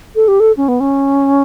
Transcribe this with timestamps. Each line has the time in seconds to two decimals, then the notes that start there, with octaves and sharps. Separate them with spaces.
0.16 A4
0.28 G4
0.40 A4
0.57 C#4
0.68 B3
0.80 C#4